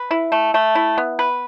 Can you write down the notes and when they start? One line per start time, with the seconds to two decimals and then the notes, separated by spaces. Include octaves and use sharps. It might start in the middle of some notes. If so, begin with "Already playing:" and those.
Already playing: B4
0.11 E4
0.32 A3
0.54 A3
0.75 E4
0.98 B3
1.19 B4